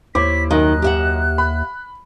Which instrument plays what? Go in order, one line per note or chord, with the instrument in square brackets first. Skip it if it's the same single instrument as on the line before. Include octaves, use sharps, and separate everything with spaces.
[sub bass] D#2 [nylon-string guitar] E4 [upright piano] C5 C#5 D6 [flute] B6
[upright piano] F#2 D#5 [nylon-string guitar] D#3 [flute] F#6
[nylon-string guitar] G4 E5 F#5
[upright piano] B5